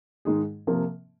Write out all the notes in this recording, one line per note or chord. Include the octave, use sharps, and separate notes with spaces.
G#2 D#3 G#3 D#4 G#4
C3 F3 A#3